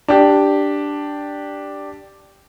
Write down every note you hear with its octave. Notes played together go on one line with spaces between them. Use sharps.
D4 G4